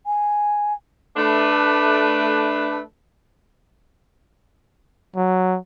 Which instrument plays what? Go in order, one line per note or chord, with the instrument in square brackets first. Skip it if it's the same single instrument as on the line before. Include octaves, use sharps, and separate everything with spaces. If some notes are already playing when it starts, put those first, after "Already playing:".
[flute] G#5
[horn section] A3 D4 B4
[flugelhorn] F#3